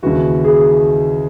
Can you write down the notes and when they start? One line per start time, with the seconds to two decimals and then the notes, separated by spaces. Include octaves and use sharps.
0.03 D#2 C#3 E3 F#4
0.45 G#4